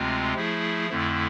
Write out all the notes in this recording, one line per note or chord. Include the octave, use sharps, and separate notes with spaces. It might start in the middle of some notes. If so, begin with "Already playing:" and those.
Already playing: D2 C3 G#3 C4 F4
F3 A3 E4 G#4
F2 D3 A3 E4